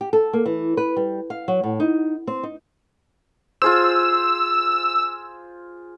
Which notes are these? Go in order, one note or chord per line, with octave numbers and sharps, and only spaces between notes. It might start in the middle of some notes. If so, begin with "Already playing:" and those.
G4
A4
A#3
E3
B4
G3
F5
F#3
A2
D#4
C4
D#4
F4 G#4 C5 E6